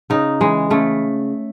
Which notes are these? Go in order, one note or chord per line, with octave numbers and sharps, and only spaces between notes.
C#3 D#4
E3 G#3
C#3 A3